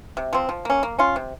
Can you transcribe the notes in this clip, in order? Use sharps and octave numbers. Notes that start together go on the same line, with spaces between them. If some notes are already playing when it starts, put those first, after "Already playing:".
C3
F3 C4
F3
A#3 C#4
A#3
C#4 F4
C3